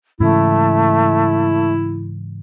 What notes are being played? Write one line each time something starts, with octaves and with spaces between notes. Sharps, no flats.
G#2 C#3 E3 A3 E4